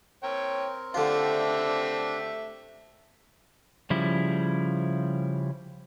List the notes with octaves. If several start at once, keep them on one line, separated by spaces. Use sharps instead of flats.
C4 A#4 C#5 G5
D3 A3 C4 D4 F4 G4 E5
C#3 F3 G3 E4